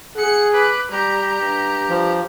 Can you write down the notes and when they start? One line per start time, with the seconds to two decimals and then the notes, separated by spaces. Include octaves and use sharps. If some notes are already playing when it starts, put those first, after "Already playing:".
0.16 G#4 F#5 C#7
0.52 B4 D6
0.91 G3 G4 A#5
1.42 G2
1.90 F3